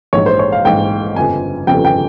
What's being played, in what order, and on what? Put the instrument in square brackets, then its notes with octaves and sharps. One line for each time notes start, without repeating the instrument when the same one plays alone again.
[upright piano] A#1 G#2 E3 C#5
C5
C#5
F5
A#1 G#2 E3 G5
G1 F2 C#3 F3 G#5
G1 F2 C#3 F3 G5
G5